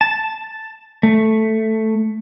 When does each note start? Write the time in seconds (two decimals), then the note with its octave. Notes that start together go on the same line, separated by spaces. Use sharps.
0.01 A5
1.03 A3